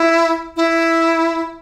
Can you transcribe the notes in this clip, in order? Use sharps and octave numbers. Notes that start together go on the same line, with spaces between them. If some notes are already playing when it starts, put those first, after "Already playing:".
Already playing: E4
E4